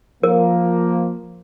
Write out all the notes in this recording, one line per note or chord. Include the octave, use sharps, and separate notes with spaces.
F3 A#3 A#4